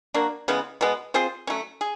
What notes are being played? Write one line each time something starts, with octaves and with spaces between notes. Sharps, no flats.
F#3 A#3 D4 F#4
C#3 E3 G#3 B3
B2 G#3 B3
C4 F4 G#4 C5
F#3 A3 C#4
G#4